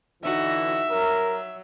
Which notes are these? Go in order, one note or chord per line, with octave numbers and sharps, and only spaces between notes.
D3 E3 D#4 F#4 E5
F#3 A#4